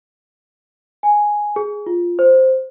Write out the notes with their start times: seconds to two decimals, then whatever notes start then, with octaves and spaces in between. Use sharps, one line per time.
1.03 G#5
1.56 G#4
1.87 F4
2.19 C5